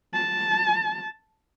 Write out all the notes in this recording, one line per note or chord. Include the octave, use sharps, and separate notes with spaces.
A5